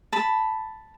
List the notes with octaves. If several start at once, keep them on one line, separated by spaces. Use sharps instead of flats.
A5 B5